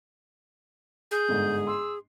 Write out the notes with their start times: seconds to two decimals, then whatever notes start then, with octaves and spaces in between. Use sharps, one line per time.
1.11 G#4 G6
1.29 G1 G#2
1.67 C6 E6